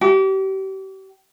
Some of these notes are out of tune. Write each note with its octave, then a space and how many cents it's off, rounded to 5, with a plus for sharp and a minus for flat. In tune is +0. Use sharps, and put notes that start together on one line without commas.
G4 -35